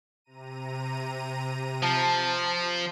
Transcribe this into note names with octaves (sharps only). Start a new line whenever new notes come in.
C3 A#5 D#7
F3 A5